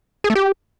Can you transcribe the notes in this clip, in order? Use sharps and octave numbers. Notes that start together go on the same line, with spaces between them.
G#4
A3
G4